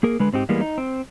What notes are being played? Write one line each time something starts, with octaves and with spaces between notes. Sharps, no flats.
A#3 G#4 A#4
D3 G#3 B4
G#2 C4 D#4 G4
E3 G3 G#3 A#3 B3
D#4
C4